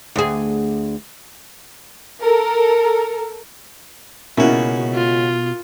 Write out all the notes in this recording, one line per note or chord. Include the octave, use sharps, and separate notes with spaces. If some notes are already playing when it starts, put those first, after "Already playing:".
D2 G#4
A4 A#4
C#2 B2 A#3 C#4 E4 F#4
F4